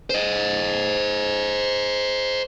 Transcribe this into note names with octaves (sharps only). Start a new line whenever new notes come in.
C5 D#5